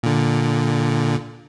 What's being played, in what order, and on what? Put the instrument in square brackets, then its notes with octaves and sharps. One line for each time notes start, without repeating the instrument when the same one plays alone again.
[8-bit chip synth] A#2 D3